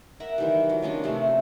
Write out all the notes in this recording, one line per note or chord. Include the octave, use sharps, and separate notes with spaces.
A#4 E5 F#5
D#3 E3 G3
F#3
D#3 F3 C#4 D4
C3 F3 A3 C#4